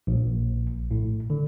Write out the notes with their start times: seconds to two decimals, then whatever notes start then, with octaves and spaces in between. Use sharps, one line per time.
0.07 A#1
0.91 A2
1.30 D3